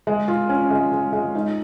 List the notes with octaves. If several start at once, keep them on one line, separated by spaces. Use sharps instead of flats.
G#3
F4
C#4
G#3
G#3
G#3
D#4